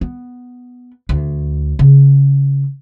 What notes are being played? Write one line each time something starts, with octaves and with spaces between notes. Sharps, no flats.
B3
D2
C#3